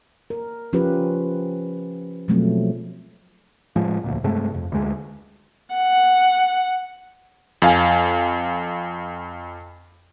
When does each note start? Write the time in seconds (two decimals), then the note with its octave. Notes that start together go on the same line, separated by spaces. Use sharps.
0.30 A#4
0.73 F3 C#4 F4 G4 B4
2.28 B2 F3 F#3 G#3 A3 C4
3.76 A2 F3 G#3
4.04 E1 D2 A#2
4.24 G2 C3 G#3 A3
4.54 F2
4.72 D2 G#3
5.75 F#5
7.62 F2 F5 G#5